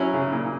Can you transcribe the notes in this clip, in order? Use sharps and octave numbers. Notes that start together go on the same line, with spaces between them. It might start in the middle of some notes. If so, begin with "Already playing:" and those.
Already playing: F#3 C#4 E4
C#3
A#2